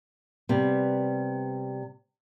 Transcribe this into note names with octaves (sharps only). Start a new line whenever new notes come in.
C3 G3 B3